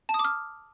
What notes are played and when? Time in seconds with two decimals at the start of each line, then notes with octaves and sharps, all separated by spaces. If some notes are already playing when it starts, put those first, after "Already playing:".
0.09 A5
0.14 D#6
0.19 D6
0.25 F6